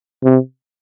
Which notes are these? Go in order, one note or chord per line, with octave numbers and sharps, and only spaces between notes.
C3